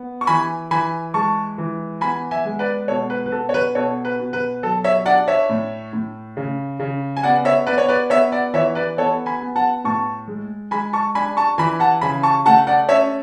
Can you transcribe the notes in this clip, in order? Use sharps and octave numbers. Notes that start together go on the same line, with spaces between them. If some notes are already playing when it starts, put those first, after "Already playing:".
Already playing: B3
C#6
E3 G#5 B5
E3 G#5 B5
G#3 A5 C#6
E3
B3 G#5 B5
E5 G#5
G#3
B4 D5
B2 A4 C#5
B4
B4
B2 A4
C#5
B4
B2 A4 C#5
B4
B2
B4
F#3 A4
C#5 E5
D4 D5 F#5
C#5 E5
A2
A2
C#3
C#3
G#5
B3 D5 F#5
C#5 E5
B3 B4 D5
C#5
B4 D5
B3 C#5 E5
D5 F#5
E3 C#5 E5
B4 D5
B3 A4 C#5
G#5 B5
B3
F#5 A5
A2 A5 C#6
G#3
G#3 G#5 B5
A5 C#6
D4 G#5 B5
A5 C#6
E3 G#5 B5
F#5 A5
C#3 G#5 B5
A5 C#6
A3 F#5 A5
D5 F#5
C#4 C#5 E5